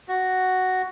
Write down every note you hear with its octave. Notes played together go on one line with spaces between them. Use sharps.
F#4